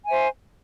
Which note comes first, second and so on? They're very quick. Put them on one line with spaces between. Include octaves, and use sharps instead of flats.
G#5 E5 C5